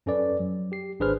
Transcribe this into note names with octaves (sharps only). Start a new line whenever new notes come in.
F#2 C#4 A4 B4 D5
F#3
G4 C7
G#1 D4 G#4 B4 C5 F6